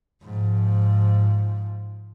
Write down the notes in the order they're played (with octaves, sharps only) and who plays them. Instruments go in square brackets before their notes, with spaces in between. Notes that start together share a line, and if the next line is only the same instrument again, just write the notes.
[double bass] G#2 F3